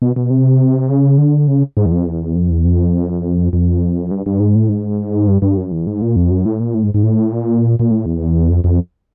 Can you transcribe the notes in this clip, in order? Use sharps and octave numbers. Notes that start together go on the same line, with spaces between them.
B2
B2
C3
C#3
D3
C#3
G#2
E2
F2
E2
F2
E2
F2
F2
G2
G2
G#2
A2
G#2
G2
G2
F#2
E2
G#2
A#2
F2
F#2
A2
A#2
A2
G#2
G#2
A2
A#2
A#2
A2
E2
F2
F2